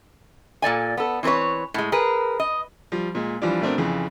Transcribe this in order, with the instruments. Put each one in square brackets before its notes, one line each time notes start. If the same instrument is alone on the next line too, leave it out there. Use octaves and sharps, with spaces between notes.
[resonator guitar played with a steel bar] A#2 A4 D5 G#5
B3 A4
E3 C4 A#4 B4 C#5
A2 G#3
G#4 A#4 B4
D#5
[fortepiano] F3 G3
A#2 G#3
E3 F3 G3 D4 F4 D5
B2 A3 C4 D4 A#4
F2 C#3 E3